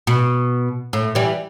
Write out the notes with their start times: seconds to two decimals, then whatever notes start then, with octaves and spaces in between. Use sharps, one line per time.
0.07 B2
0.93 A2
1.15 E3 G3